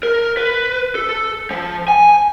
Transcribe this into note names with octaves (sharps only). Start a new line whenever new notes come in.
A#4
B4
A4
F3
G#5